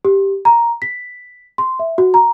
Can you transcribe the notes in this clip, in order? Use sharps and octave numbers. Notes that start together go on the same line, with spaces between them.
G4
A#5
B6
C6
E5
F#4
A#5